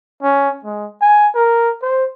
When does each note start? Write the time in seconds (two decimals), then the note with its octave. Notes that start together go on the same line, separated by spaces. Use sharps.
0.23 C#4
0.64 G#3
1.01 G#5
1.35 A#4
1.83 C5